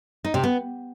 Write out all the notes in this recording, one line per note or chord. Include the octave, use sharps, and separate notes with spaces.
D#4
C3
B3